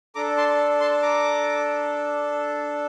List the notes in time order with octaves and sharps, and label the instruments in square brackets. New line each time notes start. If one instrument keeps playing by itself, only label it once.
[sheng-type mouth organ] D4 A4 A#5 D6
A5 C6
A5 C6
A#5 D6